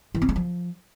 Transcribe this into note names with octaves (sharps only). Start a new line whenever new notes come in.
E3
C4
G#3
F3